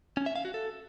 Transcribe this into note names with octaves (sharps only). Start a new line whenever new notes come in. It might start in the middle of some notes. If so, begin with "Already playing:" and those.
C#4
E5
F5
F#4
A4